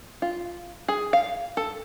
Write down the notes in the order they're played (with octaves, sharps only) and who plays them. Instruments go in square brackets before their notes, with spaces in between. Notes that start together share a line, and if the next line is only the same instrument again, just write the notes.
[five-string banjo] F4
G#4
F5
A4